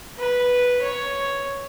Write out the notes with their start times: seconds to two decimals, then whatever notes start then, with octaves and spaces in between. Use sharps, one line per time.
0.19 B4
0.82 C#5